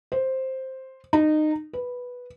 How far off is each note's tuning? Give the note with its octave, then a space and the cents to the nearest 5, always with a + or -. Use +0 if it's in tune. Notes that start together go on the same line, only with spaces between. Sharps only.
C5 +5
D#4 -20
B4 -5